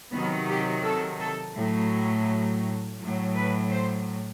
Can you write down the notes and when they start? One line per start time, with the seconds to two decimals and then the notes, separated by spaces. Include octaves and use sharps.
0.11 C3 D#3 F#3 B3
0.48 G4
0.83 A4
1.20 A4
1.55 A2 F#3
2.99 A2 F#3
3.35 B4
3.71 C5